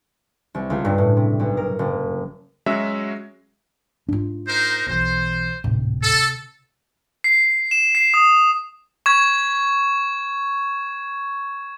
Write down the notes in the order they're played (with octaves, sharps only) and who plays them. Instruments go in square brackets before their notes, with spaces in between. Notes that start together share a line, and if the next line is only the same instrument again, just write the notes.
[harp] C2
C#2
G2
A2
C3
B1
A#4
F#1
[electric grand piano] F#3 G#3 C#4 F#4 E5
[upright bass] G#2 F4 [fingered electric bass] D4
[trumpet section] D#4 A#4 C5
[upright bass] B1 E3 [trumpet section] C5
[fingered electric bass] D1 G#1 A2 [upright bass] C3
[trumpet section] A4
[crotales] C7
E7
C7
D#6
C#6 G#6